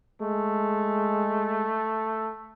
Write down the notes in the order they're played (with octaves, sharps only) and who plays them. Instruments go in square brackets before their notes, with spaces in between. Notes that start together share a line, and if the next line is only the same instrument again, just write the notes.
[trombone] G#3 [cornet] A3